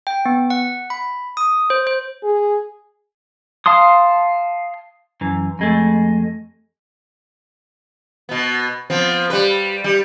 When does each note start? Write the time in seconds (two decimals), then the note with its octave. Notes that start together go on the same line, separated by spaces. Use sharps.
0.07 G5
0.25 B3
0.50 F#5
0.90 B5
1.37 D#6
1.70 C5
1.87 C5
2.23 G#4
3.66 F5 A5 C6 D#6
5.21 F#2 E3
5.59 F2 G#3 A3
8.29 B2 B3
8.90 F3 B3 C4
9.30 G3 B4
9.84 G3